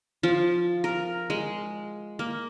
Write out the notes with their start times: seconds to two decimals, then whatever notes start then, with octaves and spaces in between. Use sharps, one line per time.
0.23 F3
0.84 A#4
1.30 G#3
2.19 A#3